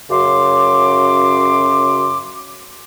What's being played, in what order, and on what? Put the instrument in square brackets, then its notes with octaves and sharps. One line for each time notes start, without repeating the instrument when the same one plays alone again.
[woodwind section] F#2 C#3 F#4 C6 D6